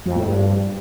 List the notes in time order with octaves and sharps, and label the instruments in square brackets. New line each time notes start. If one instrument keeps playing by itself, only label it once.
[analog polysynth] F2
A2
G2